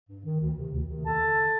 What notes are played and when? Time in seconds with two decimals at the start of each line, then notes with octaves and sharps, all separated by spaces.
0.09 G2
0.25 D#3
0.41 D2
0.57 C3 D#3
0.72 D2
0.89 C3 D#3
1.04 D#2 A4 A5
1.21 D3